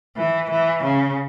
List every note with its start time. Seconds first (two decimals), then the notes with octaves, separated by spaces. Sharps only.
0.17 E3
0.51 E3
0.83 C#3